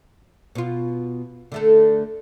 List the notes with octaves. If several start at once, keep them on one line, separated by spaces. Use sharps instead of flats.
B2 F4
D3 A3 A4